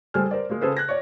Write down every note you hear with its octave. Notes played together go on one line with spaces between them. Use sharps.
G3 G#3 A4 C5 G#5 F6
A#4 C5 D5
G#3 A#3
C#3 G#4 A4 B4 C5
F#6 G#6 A#6
C#5 D5